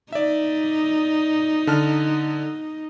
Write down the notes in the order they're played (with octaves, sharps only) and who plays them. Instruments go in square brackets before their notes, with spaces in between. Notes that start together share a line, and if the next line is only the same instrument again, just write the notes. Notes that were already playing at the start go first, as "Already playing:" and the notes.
[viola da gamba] D#4 [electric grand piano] D5 E5
[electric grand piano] D3 A5 F6